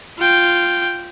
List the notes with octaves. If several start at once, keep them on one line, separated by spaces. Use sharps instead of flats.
F4 G5